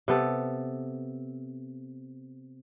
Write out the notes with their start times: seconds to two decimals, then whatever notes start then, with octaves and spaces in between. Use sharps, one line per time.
0.08 C3 B3 A4